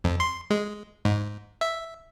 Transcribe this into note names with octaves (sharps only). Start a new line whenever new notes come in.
F2
C6
G#3
G#2
E5